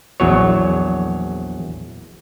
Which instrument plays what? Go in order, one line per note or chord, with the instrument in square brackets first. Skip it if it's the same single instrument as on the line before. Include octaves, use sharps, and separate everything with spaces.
[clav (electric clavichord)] A#1 E2 F#3 C#5